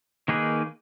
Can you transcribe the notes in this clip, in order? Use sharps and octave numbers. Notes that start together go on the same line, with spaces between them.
D#3 A#3 D#4 G#4 B4